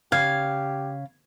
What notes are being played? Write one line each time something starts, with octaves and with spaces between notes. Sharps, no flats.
C#3 G4 F5 G#6